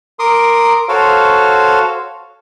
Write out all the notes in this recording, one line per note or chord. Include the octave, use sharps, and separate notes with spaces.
A#4 C6 D6 D#6
F#4 A4 C5 C#5 F5